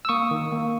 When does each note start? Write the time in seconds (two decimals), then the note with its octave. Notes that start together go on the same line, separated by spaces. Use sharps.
0.05 E6
0.09 A#3 C#6 D#6
0.31 D#3
0.52 A#3